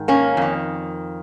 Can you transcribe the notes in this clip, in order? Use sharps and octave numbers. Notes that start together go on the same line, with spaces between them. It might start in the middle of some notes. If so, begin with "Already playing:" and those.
Already playing: G#2 D#3
A#3 C#4
F2 D#3